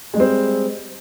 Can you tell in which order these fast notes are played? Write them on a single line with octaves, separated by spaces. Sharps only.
G#3 G3 C4